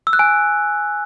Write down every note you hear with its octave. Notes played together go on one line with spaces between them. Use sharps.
E6
F#6
G#5